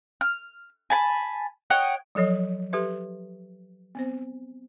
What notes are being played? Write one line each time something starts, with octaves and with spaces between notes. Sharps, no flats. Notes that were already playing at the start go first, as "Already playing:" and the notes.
F6
G#5 A5 B5
C#5 D#5 F#5 G5
F3 F#3 A4 C#5 D#5
G4 A4 B4 E5 C6
B3 C4 C5